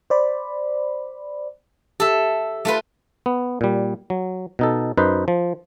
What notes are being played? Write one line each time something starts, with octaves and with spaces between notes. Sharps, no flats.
C5 D5 B5
G4 A4 E5
A3 F4 B4
B3
A#2 G3
F#3
B2 D#4 A4
F#2 D#4 B4 C5
F3